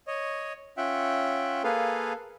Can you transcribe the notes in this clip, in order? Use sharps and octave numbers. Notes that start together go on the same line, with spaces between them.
C#5 D#5
C#4 F4 E5 F#5 G5
A#3 G#4 A4 B4 F5